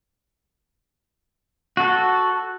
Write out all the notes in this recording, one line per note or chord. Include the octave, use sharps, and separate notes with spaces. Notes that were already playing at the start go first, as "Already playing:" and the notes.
F#4 A4